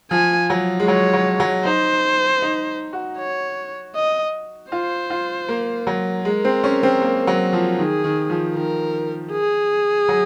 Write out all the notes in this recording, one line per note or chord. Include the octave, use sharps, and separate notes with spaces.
F3 G#5
F#3
G#3
F#3 C#5
F#3
F#3
D#4 C5
D#4
F#4
C#5
D#5
F4 C5
F4
A#3
F#3
G#3 A#4
C4
C#4
C4
A#3
F#3
F3
D#3 G#4
D#3
F3
D#3 A#4
G#4
F#3